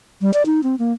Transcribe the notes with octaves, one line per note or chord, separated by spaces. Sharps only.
G3
D5
D#4
C4
A#3